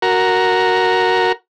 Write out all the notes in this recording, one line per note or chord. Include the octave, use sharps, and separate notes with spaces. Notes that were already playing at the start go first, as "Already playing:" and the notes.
F#4 A#4